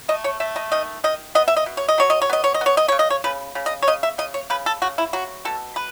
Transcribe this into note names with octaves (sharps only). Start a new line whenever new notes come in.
A3 D#5
C#5
A3 E5
D#5
D#3 D#5
D#3 D#5
B3 D#5
E5
D#5
B2
C#5
D#5
F#3 C#5
D#5
C#5
B3 D#5
C#5
D#5
B3 C#5
D#5
C#3 C#5
D#5
C#5
C#3 B4
C#3
D#5
C#5
C#3 D#5
E5
C#3 D#5
C#5
C#3 B4
A4
C#3 F#4
E4
F#3 F#4
B2 A4
B4